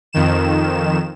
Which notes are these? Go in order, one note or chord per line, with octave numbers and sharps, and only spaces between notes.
F2 D#3 E7